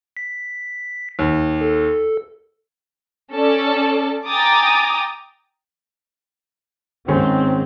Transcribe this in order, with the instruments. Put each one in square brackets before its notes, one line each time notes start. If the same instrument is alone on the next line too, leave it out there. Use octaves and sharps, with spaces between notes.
[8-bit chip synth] B6
[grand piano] D#2
[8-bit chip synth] A4
[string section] C#4 A4 D5 A5
G5 G#5 A#5 D6 D#6 A6
[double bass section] G#2 C4 [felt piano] D#3 G#3 C#4